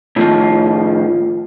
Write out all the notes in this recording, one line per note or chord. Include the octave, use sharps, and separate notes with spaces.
A2 D#3 F3